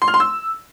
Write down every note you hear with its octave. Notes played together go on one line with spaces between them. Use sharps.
C6
F6
C6
E6